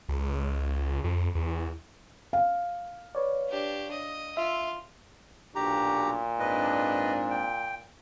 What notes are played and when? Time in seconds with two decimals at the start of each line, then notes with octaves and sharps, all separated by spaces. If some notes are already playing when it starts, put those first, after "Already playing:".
0.09 C#2
1.04 F2
1.35 E2
2.33 F5
3.15 B4 C#5 D5
3.49 D4 G4
3.91 D#5
4.37 F4 E5
5.55 B1 A#2 D4 F#4 G4 A#5
6.40 G#2 C4 D4 B4 D#5
7.30 G5